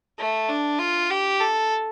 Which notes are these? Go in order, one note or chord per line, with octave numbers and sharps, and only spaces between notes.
A3
D4
F4
G4
A4